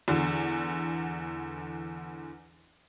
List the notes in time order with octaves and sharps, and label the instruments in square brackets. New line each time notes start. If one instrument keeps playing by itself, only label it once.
[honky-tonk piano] E2 D3